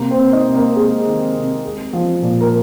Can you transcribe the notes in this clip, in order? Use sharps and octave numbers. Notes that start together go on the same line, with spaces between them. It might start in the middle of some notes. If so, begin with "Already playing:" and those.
Already playing: C3 A#3 A#4
C4 C5
C3
D#4 D#5
C3
A#3 A#4
C3 G#3 G#4
D#3
C3
G#3
F3
A#2
A#4